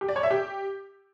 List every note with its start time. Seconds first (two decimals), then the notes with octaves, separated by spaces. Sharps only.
0.01 G4
0.08 D5
0.16 C#5
0.23 E5
0.31 G4